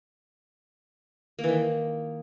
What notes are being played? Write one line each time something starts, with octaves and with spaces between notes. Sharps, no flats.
A#3
E3
D#3